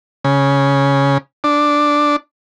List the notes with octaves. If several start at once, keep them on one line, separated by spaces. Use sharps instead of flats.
C#3
D4